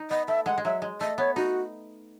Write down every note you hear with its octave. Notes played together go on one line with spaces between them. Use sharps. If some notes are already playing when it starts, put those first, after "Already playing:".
Already playing: D#4
B3 D#5
A3 E5
G#3 F#5
G#3
F#3 E5
G#3
A3 D#5
B3 C#5
D#4 F#4